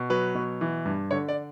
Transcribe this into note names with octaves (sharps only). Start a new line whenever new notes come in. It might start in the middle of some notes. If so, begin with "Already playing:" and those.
Already playing: B2
F#3 B4
B2
E3
G2
D3 C#5
D5